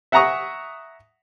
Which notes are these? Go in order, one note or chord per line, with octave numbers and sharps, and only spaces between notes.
E5 F#5 G#5 A#5 C#6 D#6